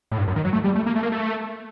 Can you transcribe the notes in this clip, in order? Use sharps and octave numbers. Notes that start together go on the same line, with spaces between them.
A2
G2
F#2
D#3
F#3
A3
G3
A3
A#3
A3
A#3
A3